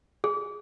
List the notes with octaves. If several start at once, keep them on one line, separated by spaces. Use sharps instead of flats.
G#4